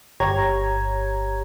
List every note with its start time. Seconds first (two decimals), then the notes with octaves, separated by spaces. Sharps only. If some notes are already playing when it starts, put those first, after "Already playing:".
0.20 G1 G4 C#5 A#5 G#6